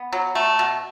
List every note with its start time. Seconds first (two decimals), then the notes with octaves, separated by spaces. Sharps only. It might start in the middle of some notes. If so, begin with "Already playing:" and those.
Already playing: B3
0.13 F#3
0.35 A3
0.59 B2